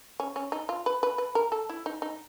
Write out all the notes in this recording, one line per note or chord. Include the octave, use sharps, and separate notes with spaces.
C#4
C#4
D#4
F4
B4
B4
B4
A#4
A4
E4
D#4
D#4